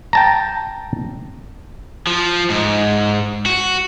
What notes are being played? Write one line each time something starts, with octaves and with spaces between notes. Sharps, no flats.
G5 A5 A#5
F3
G#2
F#4